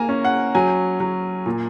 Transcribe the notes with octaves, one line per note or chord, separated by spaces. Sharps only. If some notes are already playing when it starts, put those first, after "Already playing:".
Already playing: A#3 G#5 A#5
C#4
F#5
F#3 G#5
F#3
A#2